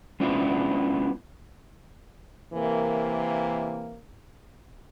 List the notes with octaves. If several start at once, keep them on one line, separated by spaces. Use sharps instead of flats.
G#3 B3 C#4 D4 E4 F4
C3 E3 A#3